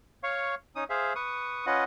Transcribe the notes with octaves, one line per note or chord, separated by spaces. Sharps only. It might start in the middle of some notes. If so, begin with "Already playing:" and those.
C#5 F5 C#6
C#4 D#4 D#6
G#4 C5 E5 F5
B4 C#6 D#6
C#4 F4 B4 D#5 F#5